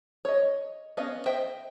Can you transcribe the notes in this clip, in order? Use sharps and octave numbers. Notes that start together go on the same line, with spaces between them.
C#5 D#5
B3 C#4 D#5 F5
C5 D#5 E5 G5